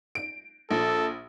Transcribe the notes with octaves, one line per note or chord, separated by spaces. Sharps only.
D7
A#1 A4